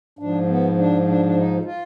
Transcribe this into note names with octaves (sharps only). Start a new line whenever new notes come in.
G#2 F3 D4
B3
D4
D4
D4
D#4
F4